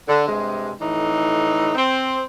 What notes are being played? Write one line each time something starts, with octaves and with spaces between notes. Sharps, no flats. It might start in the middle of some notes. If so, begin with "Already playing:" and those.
D3
G2 C3 G#3
F2 A2 E3 D#4
C4